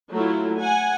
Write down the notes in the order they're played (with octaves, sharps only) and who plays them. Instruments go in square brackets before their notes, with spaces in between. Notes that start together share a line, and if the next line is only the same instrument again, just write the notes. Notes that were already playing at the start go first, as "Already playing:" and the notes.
[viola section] F#3 A3 E4 F4
F#5 G#5